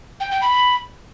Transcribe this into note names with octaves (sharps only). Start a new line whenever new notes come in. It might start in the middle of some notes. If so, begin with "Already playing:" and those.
G5
G5
B5